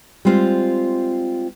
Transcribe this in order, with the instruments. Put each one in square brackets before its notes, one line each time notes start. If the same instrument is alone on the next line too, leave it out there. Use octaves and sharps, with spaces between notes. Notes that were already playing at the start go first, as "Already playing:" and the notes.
[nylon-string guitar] G3 G#3 C4 F4 C5